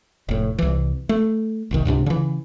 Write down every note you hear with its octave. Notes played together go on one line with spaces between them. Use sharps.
F1 A2
C2 E3
A3
F#1 C2 D#3
C#2 G#2 C3 D4
C#3 E3